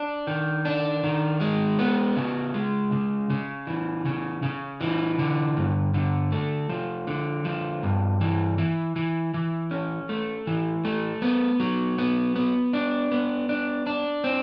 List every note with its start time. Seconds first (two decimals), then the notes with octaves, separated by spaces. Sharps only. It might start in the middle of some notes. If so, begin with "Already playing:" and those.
Already playing: D4
0.27 D#3
0.65 D4
1.04 D#3
1.41 G#3
1.79 B3
2.16 C#3
2.54 G#3
2.92 C#3
3.30 C#3
3.67 E3
4.05 C#3
4.43 C#3
4.81 E3
5.19 D3
5.56 G2
5.94 D3
6.32 A3
6.69 F3
7.07 D3
7.45 F3
7.83 G2
8.21 E3
8.58 E3
8.96 E3
9.34 E3
9.71 C#4
10.09 A3
10.47 E3
10.85 A3
11.22 B3
11.60 F#3
11.99 B3
12.36 B3
12.73 D4
13.12 B3
13.49 D4
13.87 D4
14.24 C4